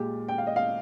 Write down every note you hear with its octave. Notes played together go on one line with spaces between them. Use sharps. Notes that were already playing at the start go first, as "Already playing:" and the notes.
Already playing: A#2 G#3 G4
G5
F5
D#5
F5